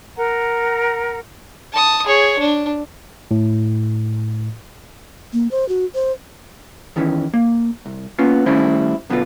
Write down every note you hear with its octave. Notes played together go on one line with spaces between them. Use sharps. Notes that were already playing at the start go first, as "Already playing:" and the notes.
A#4 F#5 A#5
A5 D#6
G#4 C#5
D4
A2
A#3
C5
F#4
C5
E2 D#3 E3 C#4
A#3
C2
A#3 B3 C#4 F4
D#3 G3 A3 C#4 E4 C5
F#2 B2 D3 B3 F4